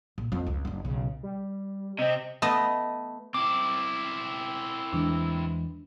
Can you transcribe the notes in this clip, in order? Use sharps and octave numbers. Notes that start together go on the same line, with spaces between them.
A#1
F2 C4
C#2
F#1 D4
B1 C#3
G3
C3 C4 D#5
A3 B3 D#5
C4 E4 D6
E2 E3 G#3 D4